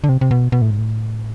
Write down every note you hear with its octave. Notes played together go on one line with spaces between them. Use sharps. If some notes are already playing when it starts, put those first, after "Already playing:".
D3
C3
C3
B2
B2
A2
G#2
A2